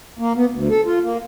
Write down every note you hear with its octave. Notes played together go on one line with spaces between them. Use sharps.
A#3
B3
D2
A4
F4
A#3